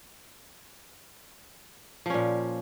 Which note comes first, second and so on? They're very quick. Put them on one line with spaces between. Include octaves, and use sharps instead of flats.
F3 C#4 A#2